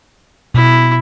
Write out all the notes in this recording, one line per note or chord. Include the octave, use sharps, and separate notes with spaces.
B2 E4